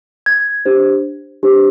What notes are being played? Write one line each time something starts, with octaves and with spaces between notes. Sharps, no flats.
G#6
D4 G4 C5
D4 G4 C5